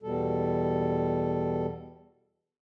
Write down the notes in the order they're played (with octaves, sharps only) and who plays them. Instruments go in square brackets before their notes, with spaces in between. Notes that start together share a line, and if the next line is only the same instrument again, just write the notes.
[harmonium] E2 B2 G3 A4